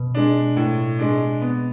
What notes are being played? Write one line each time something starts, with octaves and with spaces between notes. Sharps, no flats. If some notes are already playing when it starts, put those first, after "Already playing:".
Already playing: B2
G#3 D4
A2
G#3 D4
B3